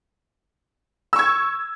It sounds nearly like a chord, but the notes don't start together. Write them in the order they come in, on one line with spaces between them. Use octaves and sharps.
E6 C#6 G#6